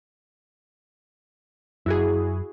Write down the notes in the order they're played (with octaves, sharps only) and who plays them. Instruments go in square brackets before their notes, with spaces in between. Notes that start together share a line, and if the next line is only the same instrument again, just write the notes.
[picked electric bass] F#2 [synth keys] E4 F#4 G#4